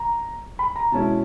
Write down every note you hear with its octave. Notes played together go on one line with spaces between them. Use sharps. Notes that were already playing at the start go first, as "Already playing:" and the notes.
Already playing: A#5
B5
A#5
B2 G#3 C#4 E4 A5